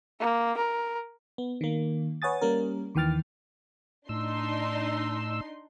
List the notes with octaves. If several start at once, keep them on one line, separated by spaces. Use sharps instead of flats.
A#3
A#4
B3
D#3 A#3
B4 C#5 F#5 G#5 D#6 A6
G3 A#3 C#4 A#4
D#2 D#3 E3 G5 F6 A6
A2 D4 D#4 C6 E6